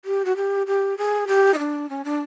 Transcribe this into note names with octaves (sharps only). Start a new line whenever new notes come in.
G4
F#4
G4
G4
G#4
G4
D#4
D4
C#4
D4